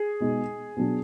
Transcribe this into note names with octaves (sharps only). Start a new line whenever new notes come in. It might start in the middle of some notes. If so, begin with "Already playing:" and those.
Already playing: G#4
B2 G#3 D#4
B2 F#3 D4